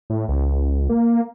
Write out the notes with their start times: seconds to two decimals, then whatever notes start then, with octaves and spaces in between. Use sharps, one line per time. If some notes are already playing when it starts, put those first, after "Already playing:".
0.10 A2
0.29 C#2
0.89 A#3